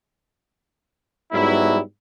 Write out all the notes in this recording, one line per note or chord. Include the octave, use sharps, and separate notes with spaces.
G#2 F#3 G3 B3 E4